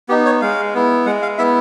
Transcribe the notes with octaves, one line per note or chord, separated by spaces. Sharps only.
B3 D#4 G4
C#5
G#3 F5
B3 E4
G#3 F#5
F5
B3 E4 E5